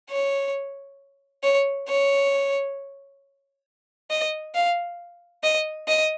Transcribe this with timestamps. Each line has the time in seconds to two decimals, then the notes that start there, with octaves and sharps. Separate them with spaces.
0.10 C#5
1.43 C#5
1.88 C#5
4.10 D#5
4.54 F5
5.43 D#5
5.88 D#5